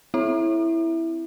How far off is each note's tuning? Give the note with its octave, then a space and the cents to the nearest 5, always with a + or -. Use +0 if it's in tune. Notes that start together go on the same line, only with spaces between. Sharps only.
C4 -15 E4 +0 E5 +0